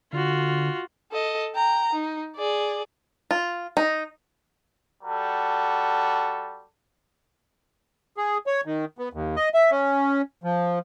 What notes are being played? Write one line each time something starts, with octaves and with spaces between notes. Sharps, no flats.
D3 F4 F#4
A4 D#5
G5 A#5
D#4
G#4 D5
F4
D#4
G3 F#4 A4
G#4
C#5
D#3
B3
D#2
D#5
E5
C#4
F3